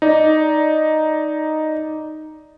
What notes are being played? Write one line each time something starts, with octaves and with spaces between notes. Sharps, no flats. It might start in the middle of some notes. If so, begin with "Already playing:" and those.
D#4 D5